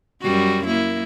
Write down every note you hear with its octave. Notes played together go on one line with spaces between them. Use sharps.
F#2 G3 F#4
A#3 E4